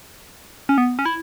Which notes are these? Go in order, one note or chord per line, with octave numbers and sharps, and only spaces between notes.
C#4
B3
C#4
E4